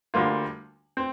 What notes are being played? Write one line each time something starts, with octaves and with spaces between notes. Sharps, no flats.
D2 D3 G3 A#3 F4
C4